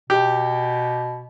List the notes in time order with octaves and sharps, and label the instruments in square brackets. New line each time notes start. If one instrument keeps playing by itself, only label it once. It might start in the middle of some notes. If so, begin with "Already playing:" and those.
[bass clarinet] B2 [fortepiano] G4